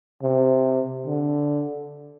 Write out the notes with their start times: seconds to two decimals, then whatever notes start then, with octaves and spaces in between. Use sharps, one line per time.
0.23 C3
1.06 D3